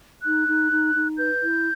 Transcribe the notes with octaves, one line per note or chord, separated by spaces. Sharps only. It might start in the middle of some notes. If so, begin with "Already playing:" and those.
D#4 F#6
D#4
D#4
D#4
B4 G6
E4